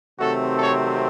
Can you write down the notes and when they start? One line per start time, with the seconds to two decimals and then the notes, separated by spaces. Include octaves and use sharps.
0.19 C3 D#3 F#3 A3 C4 F#4 A4
0.58 A4 C#5